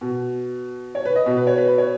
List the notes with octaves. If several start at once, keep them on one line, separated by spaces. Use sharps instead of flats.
B2
C#5
B4
D#5
B2
B4
C#5
B4
B4
C#5